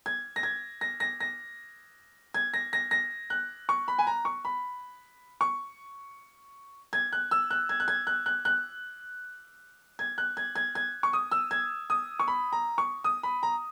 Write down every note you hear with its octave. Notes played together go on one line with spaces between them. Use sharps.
G#6
A#6
G#6
A#6
A#6
A#6
G#6
A#6
A#6
A#6
F#6
C#6
B5
G#5
A#5
C#6
B5
C#6
G#6
F#6
E6
F#6
G#6
F#6
G#6
F#6
F#6
F#6
G#6
F#6
G#6
G#6
G#6
C#6
D#6
E6
G#6
D#6
C#6
B5
A#5
C#6
D#6
B5
A#5